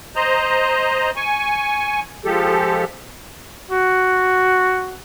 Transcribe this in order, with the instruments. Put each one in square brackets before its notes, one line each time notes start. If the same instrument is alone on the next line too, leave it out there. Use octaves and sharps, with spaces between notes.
[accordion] C5 D#5 A#5
G#5 C#6
F3 G#3 G4 A4
[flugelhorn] F#4